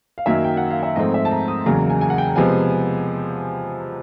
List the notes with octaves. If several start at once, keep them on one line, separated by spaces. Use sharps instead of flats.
F5
F#2 D#3 F#3 A#3 E5
G5
F#5
F5
E5
G#2 F3 A3 C4 D#5
E5
A5
A#5
D#6
E2 C#3 F#3 A#3 A#5
G#5
G#5
F#5
G5
C3 F3 G#3 B3 G#5